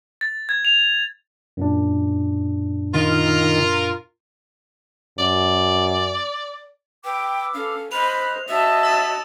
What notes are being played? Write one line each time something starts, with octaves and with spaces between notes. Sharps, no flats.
A6
G#6
F7
F#2 A#2 D4
D#3 F4 A#4
F#2 D5
B4 G5 D6 E6
C#4 A4 F5
C5 D#5 B5 F6 F#6 F7
F#4 C#5 D#5 E5 A5
E6 A6 E7